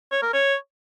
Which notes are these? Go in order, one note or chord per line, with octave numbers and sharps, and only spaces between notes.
C#5
A#4
C#5